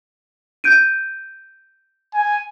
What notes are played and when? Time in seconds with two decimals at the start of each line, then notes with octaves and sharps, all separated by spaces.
0.64 G6 D7 D#7
2.14 G#5